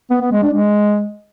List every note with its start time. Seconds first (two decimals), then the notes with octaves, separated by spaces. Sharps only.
0.10 B3
0.21 B3
0.32 G#3
0.43 D4
0.53 G#3